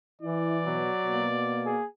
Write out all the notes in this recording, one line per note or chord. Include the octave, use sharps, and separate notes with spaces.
E3 E4 D5
B2 F#3
B2 A#3
G#4